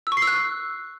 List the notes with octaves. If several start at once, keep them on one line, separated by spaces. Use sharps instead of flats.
E6
C#6
C7
E6
F#6